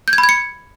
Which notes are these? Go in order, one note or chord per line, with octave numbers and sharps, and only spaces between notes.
G6
G#6
B5
G#6
C#7